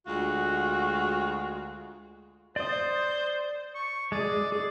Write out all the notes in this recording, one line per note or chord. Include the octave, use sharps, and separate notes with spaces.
D2 G#3 F4 F#4
C5 D5 D#6
C#6
G#3 G#4 D5
G#4 D5